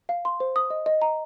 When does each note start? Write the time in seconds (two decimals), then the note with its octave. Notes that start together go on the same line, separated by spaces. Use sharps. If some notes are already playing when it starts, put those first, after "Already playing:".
0.09 F5
0.25 C6
0.40 C5
0.56 D#6
0.70 D#5
0.86 D#5
1.02 A#5